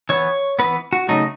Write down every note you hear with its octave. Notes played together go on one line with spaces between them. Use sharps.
E3 B3 C#5
E3 B3 B4
F#4
C#3 F#3 A3 D#4